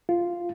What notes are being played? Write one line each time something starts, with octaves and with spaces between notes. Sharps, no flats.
F4